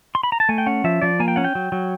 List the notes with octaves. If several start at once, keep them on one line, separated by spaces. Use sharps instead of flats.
C6
B5
A#5
A5
A3 G#5
G5
C#4 F#5
F3 E5
F3 D5
A#3 G#5
G5
C#4 F#5
G5
F#3
F#3